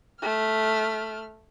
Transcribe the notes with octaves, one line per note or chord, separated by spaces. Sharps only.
A3 F6